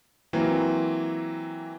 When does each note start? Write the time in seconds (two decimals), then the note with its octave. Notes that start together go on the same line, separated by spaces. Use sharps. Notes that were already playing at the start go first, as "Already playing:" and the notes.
0.33 E3 F#3 A#3 C4 F4